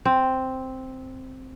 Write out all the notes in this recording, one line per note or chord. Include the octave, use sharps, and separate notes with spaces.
C4